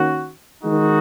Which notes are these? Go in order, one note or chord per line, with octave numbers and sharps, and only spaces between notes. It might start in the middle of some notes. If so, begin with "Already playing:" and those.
Already playing: D#3 A#3 C#4 F#4
D#3 G#3 D#4 F#4